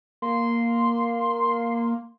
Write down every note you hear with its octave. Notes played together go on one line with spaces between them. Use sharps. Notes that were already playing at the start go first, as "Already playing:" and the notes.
A#3 C6